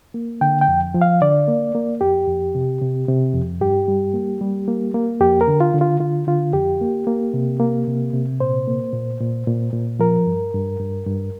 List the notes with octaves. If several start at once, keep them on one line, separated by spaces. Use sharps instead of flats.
A#3
D3 G5
G5
F2
F3
F5
D3 D5
A#3
A#3
F2 G4
F2
C3
C3
C3
F2
G2 G4
G3
A#3
G3
A#3
A#3
F2 G4
A#4
D3
F4
D3
F4
D3 F4
D3 F4
F2 G4
A#3
A#3
C3
A#3
C3
C3
A#2 C5
A#3
A#2
A#2
A#2
A#2
F3 A#4
G2
G2
G2
G2